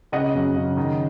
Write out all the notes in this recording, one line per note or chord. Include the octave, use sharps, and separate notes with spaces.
C#3 D#5 F#5
F#2
C#3
D#3